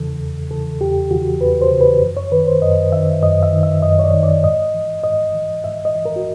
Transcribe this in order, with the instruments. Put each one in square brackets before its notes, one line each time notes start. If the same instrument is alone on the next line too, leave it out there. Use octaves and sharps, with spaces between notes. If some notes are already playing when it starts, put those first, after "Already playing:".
Already playing: [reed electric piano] E2 C#3 E3 A4
E2
C#3 E3 A4
E2 G4
C#3 E3 F#4
E2 B4
C5
C#3 E3
B4
F#2
C#5
D#3 B4
C5
F#2 D#5
D#3 E5
F#2 D#5
E5
D#3
E5
F#2 D#5
C#5
D5
D#3
D5
G#2 D#5
E3
G#2 D#5
E3
G#2 E5
D#5
E3
A#4
F#4